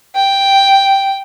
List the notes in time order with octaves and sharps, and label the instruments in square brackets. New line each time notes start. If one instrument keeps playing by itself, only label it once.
[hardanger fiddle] G5